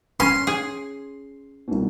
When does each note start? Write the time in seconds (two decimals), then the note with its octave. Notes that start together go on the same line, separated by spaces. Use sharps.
0.20 C#4 C6
0.47 G#4
1.68 C2 B2